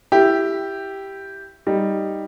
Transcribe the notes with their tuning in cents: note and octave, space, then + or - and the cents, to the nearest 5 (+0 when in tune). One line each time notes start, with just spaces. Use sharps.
E4 +5 G4 +0
G3 +0 D#4 +0